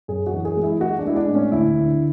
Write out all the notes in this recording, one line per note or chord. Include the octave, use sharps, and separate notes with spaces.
F#2 G#4
F#4
E3
G#4
G#3
E4
G#3 F#4
D4
G#3 E4
D4
A2
C#4
D2 E4
D3